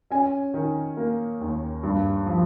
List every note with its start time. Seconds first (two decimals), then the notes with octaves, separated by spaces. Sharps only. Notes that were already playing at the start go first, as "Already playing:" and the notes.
0.11 C#4 G#5
0.54 D#3
0.97 A#3
1.41 D#2
1.83 G2
2.26 F3